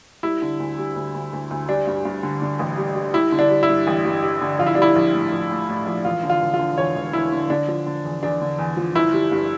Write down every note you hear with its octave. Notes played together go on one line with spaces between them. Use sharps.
G3 E4
D3
D2
G3
D2
D2
D2
D2
G3 D4
G2
G2
D3
D3
A1
G3
G3
G3 E4
D3
D4
G3
E4
G2
A1
G2
G3
D3
A#1 F4
E4
D4
G3 E4
A#1
A2
A#1
A2
A2
A#1
E1 F4
D3
F4
E1
F4
D3
E2 C#5
E1
E2 E4
D3
D3 D4
F3
D3
E2
E2 D4
D3
E2
F3
G1 E4
G3
G2